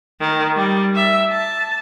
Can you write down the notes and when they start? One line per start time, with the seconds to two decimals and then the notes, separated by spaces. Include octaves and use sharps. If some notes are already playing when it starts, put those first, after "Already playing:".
0.20 D#3
0.56 G3
0.95 E5
1.30 A5